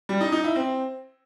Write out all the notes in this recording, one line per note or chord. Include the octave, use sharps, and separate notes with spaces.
G3
D#4
D#4
E4
C4